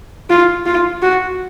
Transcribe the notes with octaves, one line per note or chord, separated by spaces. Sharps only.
F4
F4
F#4